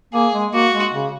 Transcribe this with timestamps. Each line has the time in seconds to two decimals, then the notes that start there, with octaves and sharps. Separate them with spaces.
0.14 A#3 G#4
0.34 G#3
0.53 A#3 F#4
0.74 G#3
0.94 C#3